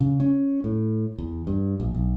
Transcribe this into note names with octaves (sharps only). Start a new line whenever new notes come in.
C#3
C#4
A2
E2
G2
A#1
B1